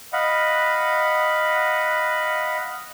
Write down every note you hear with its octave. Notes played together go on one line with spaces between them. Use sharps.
D#5 F5 F#5 B5